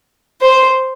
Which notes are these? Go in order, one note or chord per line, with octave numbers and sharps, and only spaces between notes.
C5